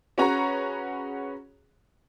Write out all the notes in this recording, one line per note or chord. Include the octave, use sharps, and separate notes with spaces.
C#4 F#4 G#4 B4 C#5 A#5